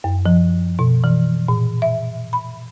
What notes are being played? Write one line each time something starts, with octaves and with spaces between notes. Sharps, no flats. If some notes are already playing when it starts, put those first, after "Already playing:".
F#2
F3
B2
E3
A#2
E5
B5